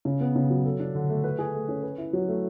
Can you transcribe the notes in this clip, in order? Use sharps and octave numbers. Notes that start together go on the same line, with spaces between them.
C#3
B3
C#3
F#3
A4
D4
D3
A3
B4
G#4
A3
C#4
B4
E4
F#3
A3